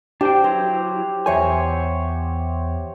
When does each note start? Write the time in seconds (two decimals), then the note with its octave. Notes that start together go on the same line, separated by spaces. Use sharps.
0.21 D4 G4 C5 G5
0.44 F#3 E4 C5
1.26 E2 C5 C#5 E5 G#5